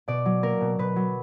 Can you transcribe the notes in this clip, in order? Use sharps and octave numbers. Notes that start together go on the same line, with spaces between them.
B2 D5
F#3
A#3 A#4
B2
B2 B4
F#3